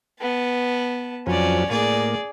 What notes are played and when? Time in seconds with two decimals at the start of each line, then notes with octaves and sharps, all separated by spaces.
0.21 B3 A5
1.27 F2 F3 F#3 C#4 D5
1.70 A2 A#3 G#4 D5